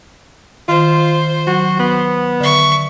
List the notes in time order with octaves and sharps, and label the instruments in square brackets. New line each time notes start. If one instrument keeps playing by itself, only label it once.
[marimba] D#3 [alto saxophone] F4 [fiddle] C5
[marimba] F#3 [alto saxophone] F#4
[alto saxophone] B3
[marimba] D3 [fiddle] E5 C#6